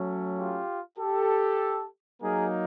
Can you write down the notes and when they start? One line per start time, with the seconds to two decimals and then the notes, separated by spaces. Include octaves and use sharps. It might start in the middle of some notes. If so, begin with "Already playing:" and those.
Already playing: F#3 A3 C#4
0.37 F4 G4
0.99 G4 A4
2.22 F#3 A#3 D#4 G#4 A#4